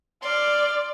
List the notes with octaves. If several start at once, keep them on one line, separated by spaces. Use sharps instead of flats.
D5 C6 F6